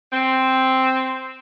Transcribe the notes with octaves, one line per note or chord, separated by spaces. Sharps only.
C4